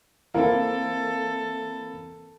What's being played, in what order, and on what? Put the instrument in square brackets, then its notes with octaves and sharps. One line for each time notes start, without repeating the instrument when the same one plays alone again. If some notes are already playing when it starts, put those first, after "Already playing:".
[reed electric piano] E3 A#3 C4 [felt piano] E4 A#4 F5 [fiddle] A4